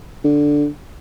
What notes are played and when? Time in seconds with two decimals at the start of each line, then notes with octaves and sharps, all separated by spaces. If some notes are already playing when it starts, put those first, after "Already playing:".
0.24 D3